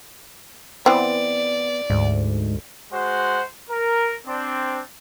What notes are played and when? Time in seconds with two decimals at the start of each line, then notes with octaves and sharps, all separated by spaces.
0.86 E3 B3 C4 D5
1.90 D2 G#2
2.93 G#3 F#4 C5 F#5
3.69 A#4
4.26 C4 D4